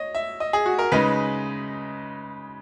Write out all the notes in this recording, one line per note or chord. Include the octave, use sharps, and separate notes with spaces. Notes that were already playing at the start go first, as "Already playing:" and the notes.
Already playing: C#5 D#5
E5
D#5
G#4
F#4
A#4
C#3 G#3 D#4 B4